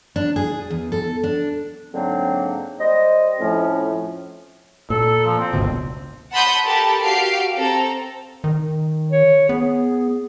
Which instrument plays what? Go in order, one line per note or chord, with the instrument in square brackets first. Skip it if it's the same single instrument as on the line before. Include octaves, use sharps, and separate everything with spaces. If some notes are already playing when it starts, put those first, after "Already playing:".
[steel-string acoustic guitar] D4
G#4
E2
A4
D4
[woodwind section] G#2 D3 F#3 A#3 C4
G3 C5 D#5
F2 A2 F3 A3 C#4
[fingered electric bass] A#2 [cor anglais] A4
[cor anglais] F3
C4
[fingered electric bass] G1 C#2 B2
[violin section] F#5 A5 B5 C6 D#6 G6
G4 A4 A#4 A5 B5
F#4 G4 F5 C7 D7
C4 A4 A#5
[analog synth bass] D#3
[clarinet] C#5
[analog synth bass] B3 [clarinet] G#4